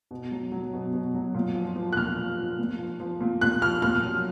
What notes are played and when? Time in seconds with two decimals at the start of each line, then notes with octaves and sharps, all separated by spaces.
0.11 B2
0.31 F#3
0.52 F#3
0.73 B2
0.93 B2
1.14 F#3
1.35 A#2
1.55 F3
1.76 F3
1.93 F#6
1.97 A#2 F6
2.17 A#2
2.38 F3
2.59 A#2
2.79 F3
3.00 F3
3.21 A#2
3.41 A#2 F#6
3.61 F3 F6
3.82 A#2 F6
4.03 F#3